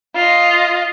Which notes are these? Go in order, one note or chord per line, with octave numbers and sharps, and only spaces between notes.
F4 D#5